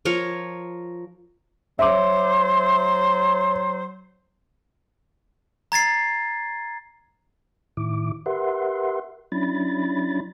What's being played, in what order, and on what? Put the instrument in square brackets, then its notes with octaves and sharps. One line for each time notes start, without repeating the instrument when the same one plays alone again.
[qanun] F3 A#4 C#5
[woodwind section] F#3 [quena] C5 [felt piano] E5 D6
[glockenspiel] A#5 G#6 A6 C7
[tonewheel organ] A2 D#3 E4 D6
G4 A#4 B4 E5 F#5 C6
F#3 C#4 D4 E4 B5 A6